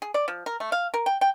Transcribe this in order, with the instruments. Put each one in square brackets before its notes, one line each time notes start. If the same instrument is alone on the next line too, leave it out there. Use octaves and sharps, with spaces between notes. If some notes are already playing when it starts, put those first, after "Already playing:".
[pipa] G#4
D5
F3
A#4
A3
F5
A#4
G5
G5